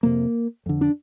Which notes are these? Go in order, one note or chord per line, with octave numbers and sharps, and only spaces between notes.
F2 C3 A#3
F2 D3
D4